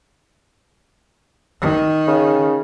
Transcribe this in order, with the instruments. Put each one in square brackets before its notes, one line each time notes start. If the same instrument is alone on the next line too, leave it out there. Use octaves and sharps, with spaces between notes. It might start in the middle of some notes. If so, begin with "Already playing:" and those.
[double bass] D#3
[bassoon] C#3